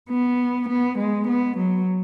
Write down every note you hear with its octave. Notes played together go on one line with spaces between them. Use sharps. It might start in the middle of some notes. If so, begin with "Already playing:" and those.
B3
B3
G#3
B3
F#3